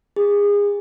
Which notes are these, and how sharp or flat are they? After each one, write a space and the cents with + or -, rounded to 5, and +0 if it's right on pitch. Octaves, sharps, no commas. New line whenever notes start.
G#4 -30